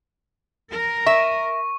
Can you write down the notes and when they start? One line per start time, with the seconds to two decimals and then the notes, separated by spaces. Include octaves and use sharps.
0.71 A#4
1.06 E5 C#6